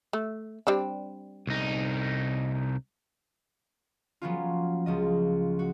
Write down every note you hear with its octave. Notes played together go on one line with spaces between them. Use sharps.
A3
G3 C4 D4
C2 D#4
F3 F#3 A#3 B3 C#4 F4
C#2 F3 D#5
F#4